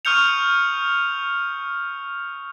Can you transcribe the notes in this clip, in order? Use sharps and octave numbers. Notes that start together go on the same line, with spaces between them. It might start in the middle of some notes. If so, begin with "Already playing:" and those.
C#6 D#6 F6 G6 C#7 F7